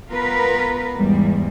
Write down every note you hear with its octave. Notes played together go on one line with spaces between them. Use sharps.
B3 F4 A#4 B4
E2 G#2 G3 G#3